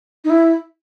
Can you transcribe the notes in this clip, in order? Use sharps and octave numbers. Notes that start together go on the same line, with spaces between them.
D#4
E4